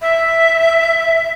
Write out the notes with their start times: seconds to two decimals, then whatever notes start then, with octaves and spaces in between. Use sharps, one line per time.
0.01 E5